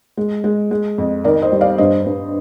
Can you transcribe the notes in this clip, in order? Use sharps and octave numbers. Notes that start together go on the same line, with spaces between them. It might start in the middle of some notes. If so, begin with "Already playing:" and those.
G#3
G#3
G#3
F2
D#3 A#4 D5
C5 D#5
G3
D5 F5
G2 C5 D#5
G2